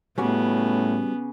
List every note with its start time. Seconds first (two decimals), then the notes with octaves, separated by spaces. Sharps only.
0.18 A2 C#3 G3 B3 C#4 F#4 C#5 D6